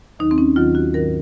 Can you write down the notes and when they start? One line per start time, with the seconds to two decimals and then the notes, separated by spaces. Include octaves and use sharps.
0.19 D#2 D#3 F#3 D#4
0.31 C4
0.38 C#4
0.56 D#2 D#3 F#3 F4
0.75 F#4
0.93 G#2 D#3 F#3 A#4